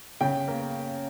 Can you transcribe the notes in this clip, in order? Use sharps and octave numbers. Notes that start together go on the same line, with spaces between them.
C#3 G5
A#3